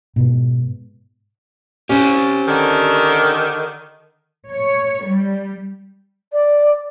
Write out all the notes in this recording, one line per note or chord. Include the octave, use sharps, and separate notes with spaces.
G#2 B2
C#4 G4 C5 D5
D3 D#3
C#5
G3
D5